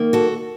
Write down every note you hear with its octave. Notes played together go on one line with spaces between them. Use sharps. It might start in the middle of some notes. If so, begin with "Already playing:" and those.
Already playing: D#3 A#3
F#4 A4